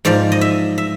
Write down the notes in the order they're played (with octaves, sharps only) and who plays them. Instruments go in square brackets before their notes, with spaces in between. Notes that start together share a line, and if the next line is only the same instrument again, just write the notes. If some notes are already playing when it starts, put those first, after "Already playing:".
[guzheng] G#2 F3 D5
D#5
E5
E5